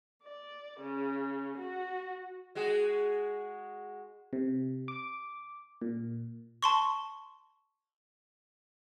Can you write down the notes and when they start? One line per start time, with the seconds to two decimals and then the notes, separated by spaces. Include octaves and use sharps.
0.23 D5
0.79 C#3
1.57 F#4
2.55 G#3 F#4 G#4
4.33 C3
4.88 D6
5.82 A#2
6.62 A5 C6 C#6